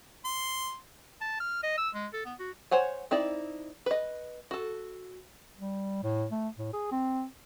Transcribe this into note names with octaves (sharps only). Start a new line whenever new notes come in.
C6
A5
F6
D#5
E6
G#3
A4
B3
F#4
C5 C#5 F#5 G#5
C4 D#4 E4 D5
B4 D#5
F#4 A4
G3
A2
A3
A2
G#4
C4